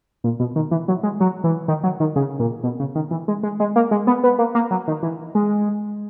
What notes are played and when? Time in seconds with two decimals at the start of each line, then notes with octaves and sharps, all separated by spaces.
0.24 A#2
0.40 B2
0.56 D#3
0.71 E3
0.88 F#3
1.03 G#3
1.20 F#3
1.44 E3
1.68 D#3
1.83 F#3
2.00 D#3
2.16 C#3
2.39 A#2
2.63 B2
2.80 C#3
2.95 D#3
3.11 E3
3.28 G#3
3.43 G#3
3.60 G#3
3.76 A#3
3.91 G#3
4.07 B3
4.24 B3
4.39 A#3
4.55 A#3
4.71 F#3
4.88 D#3
5.03 E3
5.35 G#3